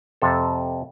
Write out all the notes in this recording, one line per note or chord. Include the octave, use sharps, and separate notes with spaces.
F2 C3 A4